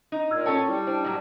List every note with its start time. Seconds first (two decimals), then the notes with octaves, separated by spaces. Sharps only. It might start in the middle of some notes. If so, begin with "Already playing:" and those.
0.12 D#4
0.31 A#2 E6 F6 G#6
0.46 C#4 A4 C#5 G5 A5 E6
0.68 G3 E4
0.87 D4 C5
1.04 A2 F#3